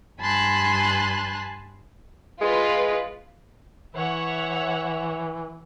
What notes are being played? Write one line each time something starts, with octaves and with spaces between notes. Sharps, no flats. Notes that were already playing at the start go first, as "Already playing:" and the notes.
G2 G#5 A5 B5 C6 F#6
G#3 F4 B4
E3 C#5 E5 F#5